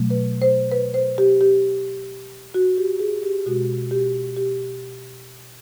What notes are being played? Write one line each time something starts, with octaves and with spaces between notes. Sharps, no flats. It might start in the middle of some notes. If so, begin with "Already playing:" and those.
Already playing: B2 F#3 A3
B4
C5
B4
C5
G4
G4
F#4
G4
G#4
G4
B2 G#3 F#4
G4
G4